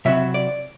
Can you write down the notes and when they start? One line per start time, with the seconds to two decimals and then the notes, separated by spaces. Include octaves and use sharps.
0.05 C3 F#3 C4 E4 E5
0.34 D5